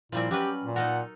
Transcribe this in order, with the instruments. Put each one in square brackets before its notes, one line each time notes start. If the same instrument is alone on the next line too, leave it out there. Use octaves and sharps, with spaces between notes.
[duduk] A#2 [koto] F3 G3 C4 [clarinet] E4
[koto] F#3 G3 B4 [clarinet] C#4 [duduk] G4
[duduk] A#2
[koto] D#4 A4 A#4 [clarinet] F#5